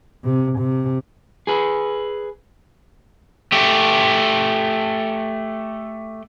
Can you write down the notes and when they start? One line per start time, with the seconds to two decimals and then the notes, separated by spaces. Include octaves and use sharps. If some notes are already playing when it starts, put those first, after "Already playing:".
0.24 C3
0.58 C3
1.47 G#4 B4
3.52 A3 G4